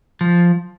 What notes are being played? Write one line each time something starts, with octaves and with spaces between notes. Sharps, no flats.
F3